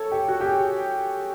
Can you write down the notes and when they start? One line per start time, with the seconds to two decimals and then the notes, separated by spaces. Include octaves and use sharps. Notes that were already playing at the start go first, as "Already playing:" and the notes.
Already playing: A4 C#5
0.12 G4
0.28 F#4
0.41 G4
0.46 G#4